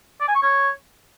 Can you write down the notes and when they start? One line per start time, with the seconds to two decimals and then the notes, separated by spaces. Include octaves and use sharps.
0.21 D5
0.28 G#5
0.35 C#6
0.43 C#5